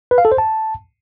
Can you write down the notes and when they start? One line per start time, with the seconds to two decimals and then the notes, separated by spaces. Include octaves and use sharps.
0.11 B4
0.18 F5
0.25 A4
0.32 C5
0.38 A5